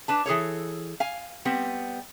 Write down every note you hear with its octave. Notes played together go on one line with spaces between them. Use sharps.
D4 B4 A5
E3 G#4 A4 C#5
F5 G#5
G3 B3 C4